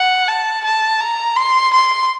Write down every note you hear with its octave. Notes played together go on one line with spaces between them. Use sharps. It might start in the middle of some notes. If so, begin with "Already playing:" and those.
Already playing: F#5
A5
A5
A#5
C6
C6